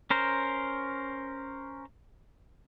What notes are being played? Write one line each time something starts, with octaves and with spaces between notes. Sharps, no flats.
C#4 A#4 C5